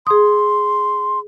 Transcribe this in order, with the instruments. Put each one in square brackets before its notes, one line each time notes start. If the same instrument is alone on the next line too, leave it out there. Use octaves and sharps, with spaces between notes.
[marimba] G#4 D#6 [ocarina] C6